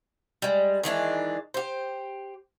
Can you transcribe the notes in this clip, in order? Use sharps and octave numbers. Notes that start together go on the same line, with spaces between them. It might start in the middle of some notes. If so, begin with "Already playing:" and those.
G3 G#3
D#3 E3 G#3 D4
G4 C5